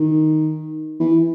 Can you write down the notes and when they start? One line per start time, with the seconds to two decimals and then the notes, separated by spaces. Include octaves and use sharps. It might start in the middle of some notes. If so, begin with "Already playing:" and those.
Already playing: D#3
1.00 E3